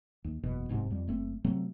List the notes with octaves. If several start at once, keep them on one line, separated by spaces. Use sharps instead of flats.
D#2
F#1 E2 B2
D1 G#2 C3
F2 G3
F#1 A3 C4
C3 F#3 A3 C4